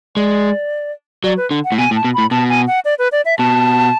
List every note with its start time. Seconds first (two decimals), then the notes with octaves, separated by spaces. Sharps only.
0.16 G#3 D5
1.24 F#3 D5
1.37 B4
1.51 D3
1.64 F#5
1.72 A2
1.78 B2 G#5
1.91 A2
1.96 A5
2.05 B2
2.14 A2 B5
2.31 B2 A5
2.49 G#5
2.67 F#5
2.85 D5
2.99 B4
3.12 D5
3.25 E5
3.38 B2 A5